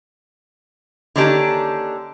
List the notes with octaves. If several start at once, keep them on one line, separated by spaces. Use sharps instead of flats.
D3 D#3 A#3 C#4 D4 G4